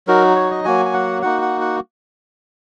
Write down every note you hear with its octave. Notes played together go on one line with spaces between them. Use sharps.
F#3 D#4 F#4 A#4
C#5
D#5
F#3 A#3 F#4 G#5
G#5
F#5
A#3 D#4 F#4 F#5
F#5
F#5